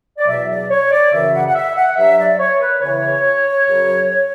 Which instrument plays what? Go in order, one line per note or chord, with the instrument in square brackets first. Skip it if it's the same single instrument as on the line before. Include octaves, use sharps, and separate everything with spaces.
[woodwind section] D5
E2 B2 F#3 E5
D5
C#5
D5
F#2 C#3 E3 E5
F#5
F#5
E5
F#5
G2 F#3 E5
D5
C#5
B4
E2 C#3 E3 C#5
F#2 C#3 F#3